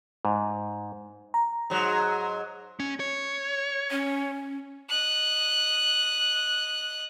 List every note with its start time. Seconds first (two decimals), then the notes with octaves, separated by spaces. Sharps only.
0.25 G#2
1.34 A#5
1.70 G#2 F#3
2.80 C#4
3.00 C#5
3.91 C#4
4.89 D#5 F#6